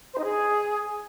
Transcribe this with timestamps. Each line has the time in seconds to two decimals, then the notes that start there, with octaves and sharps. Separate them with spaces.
0.12 C5
0.18 D#4
0.24 G#4